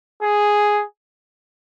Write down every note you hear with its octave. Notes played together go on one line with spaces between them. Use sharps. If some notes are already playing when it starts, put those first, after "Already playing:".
G#4